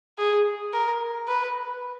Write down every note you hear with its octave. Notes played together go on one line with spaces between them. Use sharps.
G#4
A#4
B4